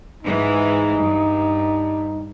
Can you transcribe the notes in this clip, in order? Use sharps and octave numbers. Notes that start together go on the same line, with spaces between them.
G#2 E3 G#3 D#4
G2